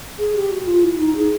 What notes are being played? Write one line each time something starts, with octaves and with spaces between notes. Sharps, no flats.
G#4
G4
F#4
F4
E4
D#4
G#4